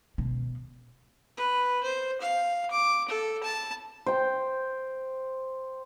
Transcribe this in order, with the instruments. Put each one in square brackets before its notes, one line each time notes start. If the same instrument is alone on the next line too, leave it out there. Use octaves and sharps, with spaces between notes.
[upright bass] B2
[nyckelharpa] B4
C5
F5
D6
A4
A5
[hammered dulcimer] C5 G5